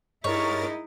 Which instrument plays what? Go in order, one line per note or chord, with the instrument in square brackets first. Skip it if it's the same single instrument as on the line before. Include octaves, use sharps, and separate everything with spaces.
[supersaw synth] G2 A#4 A6 [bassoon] G#3 [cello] D#4 E4 [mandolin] C#5